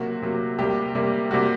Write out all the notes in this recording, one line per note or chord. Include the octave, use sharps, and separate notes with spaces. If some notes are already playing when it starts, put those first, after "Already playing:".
Already playing: C3 F#3 A#3 F#4
C3 F#3 A#3
C3 G3 A#3 G4
C3 G3 A#3
C3 G3 A#3 F#4